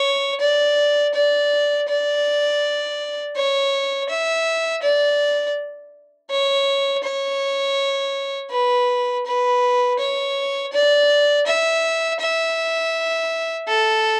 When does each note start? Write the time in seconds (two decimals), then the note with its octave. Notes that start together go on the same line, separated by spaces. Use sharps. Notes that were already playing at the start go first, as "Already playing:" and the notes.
Already playing: C#5
0.40 D5
1.14 D5
1.88 D5
3.36 C#5
4.09 E5
4.82 D5
6.30 C#5
7.03 C#5
8.51 B4
9.26 B4
9.99 C#5
10.73 D5
11.46 E5
12.20 E5
13.68 A4